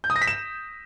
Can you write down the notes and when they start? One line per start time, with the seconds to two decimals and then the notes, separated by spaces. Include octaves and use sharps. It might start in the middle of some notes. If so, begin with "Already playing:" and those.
0.04 G6
0.10 D#6
0.16 A#6
0.22 B6
0.27 E7